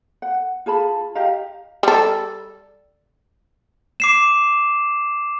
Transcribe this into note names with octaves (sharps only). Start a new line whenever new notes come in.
F#5
F4 G#4 A5 B5
G4 D#5 F5 A#5
G3 A4
D6 C7 E7